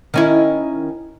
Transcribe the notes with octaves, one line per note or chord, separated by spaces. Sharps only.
D#3 C#4 E4